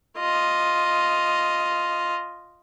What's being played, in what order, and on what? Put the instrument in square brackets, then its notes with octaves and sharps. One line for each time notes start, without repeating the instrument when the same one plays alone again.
[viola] F4 D#5